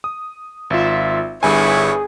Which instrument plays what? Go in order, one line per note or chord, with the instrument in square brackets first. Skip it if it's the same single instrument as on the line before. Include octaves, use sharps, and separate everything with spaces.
[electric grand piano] D#6
[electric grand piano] G#1 F4 [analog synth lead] E5
[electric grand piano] G1 G2 G#5 [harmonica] E4 B4 C#5 [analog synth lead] G#4